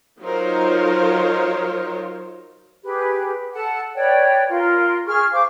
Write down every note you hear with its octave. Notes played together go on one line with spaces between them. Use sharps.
F#3 D#4 F4 A#4 C5 C#5
G4 G#4 B4
A4 F#5 A5
B4 C#5 D5 G5
F4 A#4
G#4 C#6 F6
C5 F5 D6